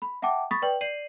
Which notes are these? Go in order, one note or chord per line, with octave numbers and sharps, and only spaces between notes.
B5
E5 F#5 G5 A5 D6
B5 C#6 D#6 A6 B6
B4 D5 G5 F#7
D5 C7 D#7 F#7